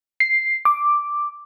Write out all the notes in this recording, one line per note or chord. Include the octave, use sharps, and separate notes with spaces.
C7
D6